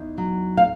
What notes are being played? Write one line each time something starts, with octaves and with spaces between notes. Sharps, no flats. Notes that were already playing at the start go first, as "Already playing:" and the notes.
Already playing: E2 D#4
F#3
F5